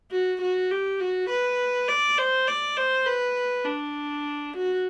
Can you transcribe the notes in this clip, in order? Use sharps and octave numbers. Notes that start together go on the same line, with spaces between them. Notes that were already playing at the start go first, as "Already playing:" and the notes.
F#4
F#4
G4
F#4
B4
D5
C5
D5
C5
B4
D4
F#4